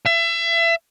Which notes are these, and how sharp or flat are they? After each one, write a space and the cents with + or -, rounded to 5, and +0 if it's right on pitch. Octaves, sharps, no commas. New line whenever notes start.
E5 +30